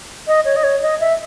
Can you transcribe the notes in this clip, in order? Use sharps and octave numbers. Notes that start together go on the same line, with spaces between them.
D#5
C#5
D#5
C#5
D#5
E5